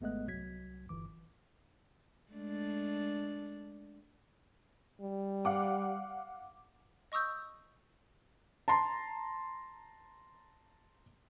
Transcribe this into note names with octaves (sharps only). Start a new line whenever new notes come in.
G#1 G#3 A3 B3 D#5 F#6
C2 F#3 G#6 B6
G1 E3 D6
G#3 A3 D4
G3
F5 F#5 D6
D#5 C#6 D#6 E6 G6
A5 A#5 C6